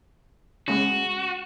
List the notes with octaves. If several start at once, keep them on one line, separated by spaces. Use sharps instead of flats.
C#3 G#3 F#4